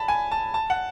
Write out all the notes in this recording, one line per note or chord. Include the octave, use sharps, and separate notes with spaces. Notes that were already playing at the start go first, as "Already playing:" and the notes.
Already playing: A5 B5
G#5
A5
A5
F#5